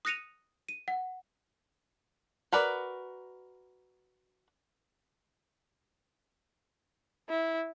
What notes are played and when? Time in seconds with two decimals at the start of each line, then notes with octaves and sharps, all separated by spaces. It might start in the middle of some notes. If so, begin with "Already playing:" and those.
0.05 D#6 F#6 A#6 C#7 D#7 F7
0.69 D#7
0.88 F#5
2.52 F#4 A#4 B4 D5
7.29 E4